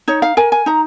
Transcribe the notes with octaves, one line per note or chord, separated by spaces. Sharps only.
D#4 C#5
F5
A#4 G#5
G#5
D#4 A#5